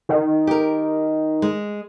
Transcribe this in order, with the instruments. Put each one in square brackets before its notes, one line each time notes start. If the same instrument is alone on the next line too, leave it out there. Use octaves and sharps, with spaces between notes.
[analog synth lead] D#3
[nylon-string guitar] G4 A#4
G#3